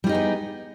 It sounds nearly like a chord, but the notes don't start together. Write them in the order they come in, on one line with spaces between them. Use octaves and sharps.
G3 F4 D#4 G#4 B3